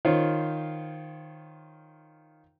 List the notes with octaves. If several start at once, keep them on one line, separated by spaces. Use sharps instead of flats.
D#3 F4 C5 C#5